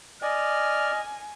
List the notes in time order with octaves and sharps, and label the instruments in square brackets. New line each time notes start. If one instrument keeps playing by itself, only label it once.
[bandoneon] D5 [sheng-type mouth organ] D#5 [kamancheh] G#5 [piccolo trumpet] F6